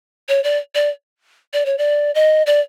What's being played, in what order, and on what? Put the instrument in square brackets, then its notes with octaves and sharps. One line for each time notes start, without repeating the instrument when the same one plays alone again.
[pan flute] C#5
D5
D5
D5
C#5
D5
D#5
D5